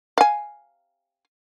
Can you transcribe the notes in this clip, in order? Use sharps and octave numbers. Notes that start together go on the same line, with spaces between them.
F5 G#5